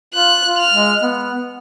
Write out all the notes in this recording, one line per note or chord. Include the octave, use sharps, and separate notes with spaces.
F4 F#6
F4
F6
G#3
B3